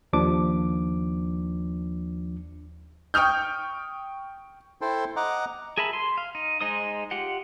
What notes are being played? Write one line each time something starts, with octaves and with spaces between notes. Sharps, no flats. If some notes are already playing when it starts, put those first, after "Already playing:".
D#2 F3 D4 D6
G5 C#6 D#6 F6 G6
E4 A4 C5 G5 C6
D#5 F#5 A#5 D6
G#4 A#4 E5 A5 B5
C6
F5
D#4
G#3 D#4 C5 D#6
F4 G4 F#5